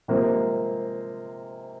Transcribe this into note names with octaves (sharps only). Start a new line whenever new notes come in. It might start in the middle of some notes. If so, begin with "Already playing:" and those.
C3 F3 G#3 A#3 C4